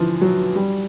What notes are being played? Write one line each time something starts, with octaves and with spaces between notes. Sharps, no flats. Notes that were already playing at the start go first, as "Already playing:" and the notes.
Already playing: D3 E3 F3
F#3
G3